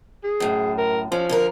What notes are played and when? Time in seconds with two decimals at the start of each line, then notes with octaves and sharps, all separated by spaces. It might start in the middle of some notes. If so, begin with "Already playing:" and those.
0.24 G#4
0.40 F#2 A2
0.78 A#4
1.12 F3 C#4
1.29 D3 A4 A#4